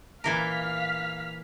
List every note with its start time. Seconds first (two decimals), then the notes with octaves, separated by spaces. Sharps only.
0.24 A#2 E3 A#4 F5 F6 B6